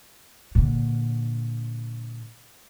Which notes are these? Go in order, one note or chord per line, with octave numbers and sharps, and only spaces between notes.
A#2 D3